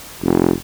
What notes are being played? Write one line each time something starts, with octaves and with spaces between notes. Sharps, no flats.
F1